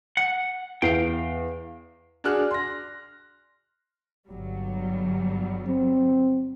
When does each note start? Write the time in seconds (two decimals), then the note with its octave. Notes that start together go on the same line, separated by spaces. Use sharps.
0.17 F#5
0.82 E2 F5 G5
2.24 D4 F#4 G#4 F6 F#6
2.51 C6 A#6
4.27 G1 F#3 G3
5.68 C4